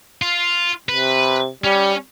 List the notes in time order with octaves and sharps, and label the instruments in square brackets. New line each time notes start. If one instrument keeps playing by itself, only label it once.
[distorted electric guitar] F4
[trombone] C3 [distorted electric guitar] B4
[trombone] G3 [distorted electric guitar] C#4